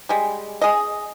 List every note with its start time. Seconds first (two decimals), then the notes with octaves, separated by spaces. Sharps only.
0.09 G3 G#3
0.61 G#4 D#5